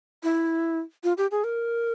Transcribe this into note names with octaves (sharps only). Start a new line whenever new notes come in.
E4
F4
G4
G#4
A#4